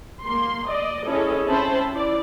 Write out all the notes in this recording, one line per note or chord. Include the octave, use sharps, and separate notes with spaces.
A#3 C6
D5 D#5
C#4 E4 G#4 A4 D#5
C4 C#4 C5 E5 A5 B5
E4 D5